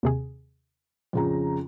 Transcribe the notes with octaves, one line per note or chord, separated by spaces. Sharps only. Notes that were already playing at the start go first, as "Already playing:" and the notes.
D#2 C3 G#4
F2 C#3 A#5